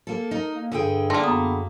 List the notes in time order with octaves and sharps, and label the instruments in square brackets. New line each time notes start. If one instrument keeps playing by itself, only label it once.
[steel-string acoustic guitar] A#3 A4
[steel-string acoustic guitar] D#4 [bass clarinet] A#4
[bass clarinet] A#3
[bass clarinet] G2 [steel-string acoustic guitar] D3 G#4 G5
[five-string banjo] A3 A#3 [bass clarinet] D4 [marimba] C6 A#6
[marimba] F#2 D#6 [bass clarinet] B3